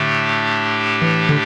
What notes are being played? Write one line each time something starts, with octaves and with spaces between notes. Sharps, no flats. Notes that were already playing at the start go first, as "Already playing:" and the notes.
Already playing: A2 D3 A3 D4 G4
E3
D3